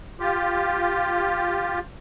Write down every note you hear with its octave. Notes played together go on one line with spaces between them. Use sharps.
F4 G4